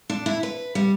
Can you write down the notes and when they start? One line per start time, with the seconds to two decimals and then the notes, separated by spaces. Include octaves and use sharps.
0.10 D4
0.26 E4
0.43 B4
0.75 G3